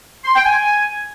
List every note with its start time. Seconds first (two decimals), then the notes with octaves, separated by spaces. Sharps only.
0.25 C6
0.35 G5
0.45 G#5